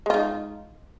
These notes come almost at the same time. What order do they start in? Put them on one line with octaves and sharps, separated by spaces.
G#3 F4 D#4